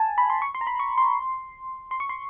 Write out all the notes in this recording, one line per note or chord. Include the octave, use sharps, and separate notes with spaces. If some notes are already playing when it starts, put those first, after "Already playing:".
Already playing: G#5 A5
B5
C6
C#6
C6
A#5
B5
C#6
C6
C6
C#6
C6